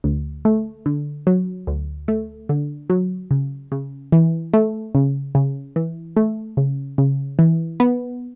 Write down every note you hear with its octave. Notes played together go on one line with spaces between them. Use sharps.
D2
A3
D3
F#3
D2
A3
D3
F#3
C#3
C#3
E3
A3
C#3
C#3
E3
A3
C#3
C#3
E3
B3